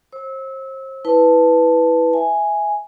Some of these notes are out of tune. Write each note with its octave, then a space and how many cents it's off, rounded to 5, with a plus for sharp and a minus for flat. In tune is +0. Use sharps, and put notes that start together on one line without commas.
C5 +35 E6 -25
E4 -15 B4 +0 A5 +0
E5 +0 G#5 +0